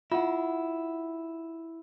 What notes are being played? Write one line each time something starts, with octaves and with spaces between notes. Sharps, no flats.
E4 F4 F#5